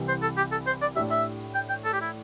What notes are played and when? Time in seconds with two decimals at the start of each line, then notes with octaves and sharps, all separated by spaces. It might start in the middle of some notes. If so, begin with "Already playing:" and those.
Already playing: C2 C3 E3
0.08 C5
0.22 A4
0.37 G4
0.52 A4
0.67 C5
0.82 D5
0.96 A2 A3 D4 G4 E5
1.11 E5
1.55 G5
1.70 G5
1.85 A4
1.93 G4
2.01 E4